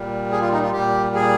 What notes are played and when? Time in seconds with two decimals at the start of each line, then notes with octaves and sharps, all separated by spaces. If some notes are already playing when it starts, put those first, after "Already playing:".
Already playing: A#2 G3
0.32 G#4
0.41 F4
0.52 D#4
0.63 F4
0.73 A#2 G3 G4
1.15 G#4